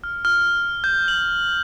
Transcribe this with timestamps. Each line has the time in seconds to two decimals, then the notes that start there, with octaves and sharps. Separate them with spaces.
0.04 F6
0.25 F6
0.84 G6
1.08 F#7